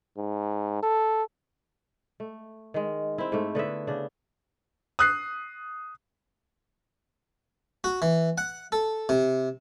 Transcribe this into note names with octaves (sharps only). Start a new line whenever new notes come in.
G#2
A4
A3
D#3 G#3
C4 E4
G#2 A3
D3 B3 E4 E5
C#3 D4
D#6 F#6 C7
F#4
E3
F#5
A4
C3